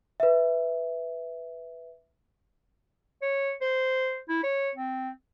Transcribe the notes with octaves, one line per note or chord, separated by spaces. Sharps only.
B4 E5
C#5
C5
E4
C#5
C4